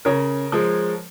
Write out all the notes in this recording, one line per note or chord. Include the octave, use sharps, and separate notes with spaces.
C#3 A#4 C#5
F3 G#3